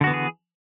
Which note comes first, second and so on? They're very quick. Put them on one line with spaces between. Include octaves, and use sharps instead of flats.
D3 F#4 B3 E3 G#4